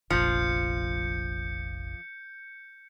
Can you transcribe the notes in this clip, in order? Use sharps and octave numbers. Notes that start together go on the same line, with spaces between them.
F1 A#1 F3 G6 C#7